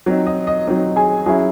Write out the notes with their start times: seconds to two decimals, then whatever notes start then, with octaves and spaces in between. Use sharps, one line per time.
0.06 F#3 C4 D#4
0.27 D#5
0.47 D#5
0.67 F#3 C4 D#4 D#5
0.96 G#4 G#5
1.26 F#3 C#4 E4 G#4 G#5